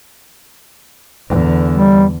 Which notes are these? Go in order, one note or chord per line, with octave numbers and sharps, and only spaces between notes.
E2 D3
G3